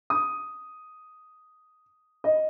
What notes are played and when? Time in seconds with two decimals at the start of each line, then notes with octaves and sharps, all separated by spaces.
0.10 D#6
2.24 D#5